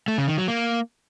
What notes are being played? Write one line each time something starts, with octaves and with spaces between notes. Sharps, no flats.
A3
C#3
D#3
F#3
A#3